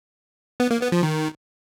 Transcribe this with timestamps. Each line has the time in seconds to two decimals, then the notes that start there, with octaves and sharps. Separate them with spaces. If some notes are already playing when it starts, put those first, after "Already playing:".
0.60 B3
0.71 A#3
0.81 B3
0.92 F3
1.03 D#3